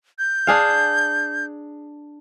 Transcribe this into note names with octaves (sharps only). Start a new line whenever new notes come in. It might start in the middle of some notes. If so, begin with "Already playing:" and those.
G6
D4 G#4 F5